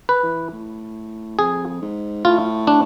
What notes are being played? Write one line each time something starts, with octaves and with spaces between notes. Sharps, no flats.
B4
E3
A2
F2 G#4
G#2
A2 F4
D4